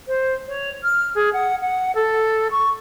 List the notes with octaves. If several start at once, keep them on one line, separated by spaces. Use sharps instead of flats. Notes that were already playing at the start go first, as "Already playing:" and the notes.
C5
C#5
F6
G#4
F#5
F#5
A4
C#6